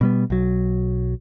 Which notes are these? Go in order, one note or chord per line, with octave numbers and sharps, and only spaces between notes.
B2 G3 B3
B1 F#3